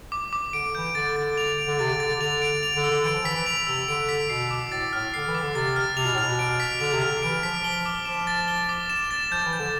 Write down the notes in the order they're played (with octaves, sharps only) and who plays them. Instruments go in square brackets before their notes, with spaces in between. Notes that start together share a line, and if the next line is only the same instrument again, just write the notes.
[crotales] D6
D6
[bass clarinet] D3 [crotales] D7
[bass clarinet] E3 [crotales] G6
[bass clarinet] D3 [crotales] A6
[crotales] A6
F7
D7
[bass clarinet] D3
[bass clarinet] C3 [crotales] A6
[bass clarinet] D3
[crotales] A6
[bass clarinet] D3
[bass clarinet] D3 [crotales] F7
[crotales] D7
F7
[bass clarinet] D3
[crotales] E6
[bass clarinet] D3
[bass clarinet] E3 [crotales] D7
[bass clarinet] F3
[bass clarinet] E3 [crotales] B6
[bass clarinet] E3
[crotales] F7
[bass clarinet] C3 [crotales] E6
[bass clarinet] D3 [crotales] D7
[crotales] B6
[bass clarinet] B2 [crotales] C7
[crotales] D6
[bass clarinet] A2 [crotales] A6
[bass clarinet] A2 [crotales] F6
[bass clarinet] D3 [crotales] C7
[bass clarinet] E3
[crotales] D6
[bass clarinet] D3
[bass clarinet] C3 [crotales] A6
[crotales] F6
[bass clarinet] C3 [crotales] F7
[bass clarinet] B2
A2
[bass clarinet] B2 [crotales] F6
[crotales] D7
B6
[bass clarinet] D3 [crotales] F7
[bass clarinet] C3
[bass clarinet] D3 [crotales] F6
[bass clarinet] E3 [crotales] D7
[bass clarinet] F3 [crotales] B6
[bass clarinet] F3 [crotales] G7
[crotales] D6
[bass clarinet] F3 [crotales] E7
[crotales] A6
G7
D6
E7
A6
[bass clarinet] F3 [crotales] G6
[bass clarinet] E3
[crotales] G6
[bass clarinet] D3